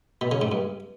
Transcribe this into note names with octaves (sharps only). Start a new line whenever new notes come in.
B2
C#3
G#2
G2